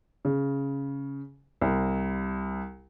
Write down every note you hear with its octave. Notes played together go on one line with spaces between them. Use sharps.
C#3
C2